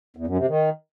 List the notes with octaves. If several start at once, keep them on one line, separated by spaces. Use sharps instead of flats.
E2
F#2
C3
D#3